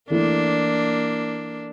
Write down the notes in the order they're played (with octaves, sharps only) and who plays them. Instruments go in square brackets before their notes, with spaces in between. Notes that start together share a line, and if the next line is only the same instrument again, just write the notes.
[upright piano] E3 A3 E4 A4 [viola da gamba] A#3 D4